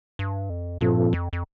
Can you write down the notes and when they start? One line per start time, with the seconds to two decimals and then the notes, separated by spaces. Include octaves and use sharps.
0.19 G2
0.50 F2
0.81 G2 A#2 F3 C4 F4 A4
1.13 F2
1.33 F2